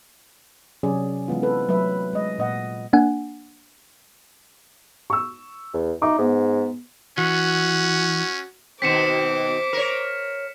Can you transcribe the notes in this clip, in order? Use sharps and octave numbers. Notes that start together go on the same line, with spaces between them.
C3 F#3 C#4 G#4 D5
E3 G#3 B3 F4
C4 A4 B4
F#3 A3 B4 E5
G#3 D#5
A#2 D#5 F#5
A#3 D4 F#5 G#5
C#6 E6
E2
D#4 E5 D6
G#2 B3
E3 C#4 F#4
B2 D#3 C4 C5 D6 B6 C#7 E7
A#4 C#5